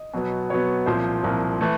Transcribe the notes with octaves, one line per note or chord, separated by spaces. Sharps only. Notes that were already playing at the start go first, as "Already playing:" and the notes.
Already playing: D#5
B2 F#3 B3
B2 F#3 B3 C#5
C2 A#2 F3 C5
C2 A#2 F3
E3 A3